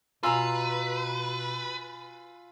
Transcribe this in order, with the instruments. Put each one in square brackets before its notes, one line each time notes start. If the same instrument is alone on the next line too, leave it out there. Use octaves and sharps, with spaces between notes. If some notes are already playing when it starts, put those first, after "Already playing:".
[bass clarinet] B2 [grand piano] F4 G#5 E6 [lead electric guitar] B4 [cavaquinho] A#5 C6